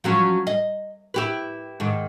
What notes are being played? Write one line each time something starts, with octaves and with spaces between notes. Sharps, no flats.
F3 F#3 C#4
D#5
E4 G4 B4
G#2 D#3